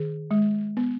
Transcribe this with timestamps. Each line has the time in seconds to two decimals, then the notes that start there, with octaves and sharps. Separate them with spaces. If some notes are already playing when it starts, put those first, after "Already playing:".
Already playing: D#3 G#4
0.31 G#3
0.77 B3